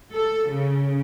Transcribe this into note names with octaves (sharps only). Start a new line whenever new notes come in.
A4
C#3